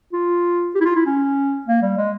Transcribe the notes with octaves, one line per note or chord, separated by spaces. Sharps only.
F4
G4
E4
F4
E4
C#4
A#3
G3
G#3